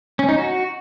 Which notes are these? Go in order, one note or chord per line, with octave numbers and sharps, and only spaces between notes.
C#4
D#4
F#4